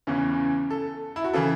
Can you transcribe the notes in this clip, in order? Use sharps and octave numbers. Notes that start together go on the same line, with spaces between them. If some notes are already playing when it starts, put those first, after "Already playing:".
E2 C#3 E3 C#4
A4
E4
F#4
C#3 E3 A4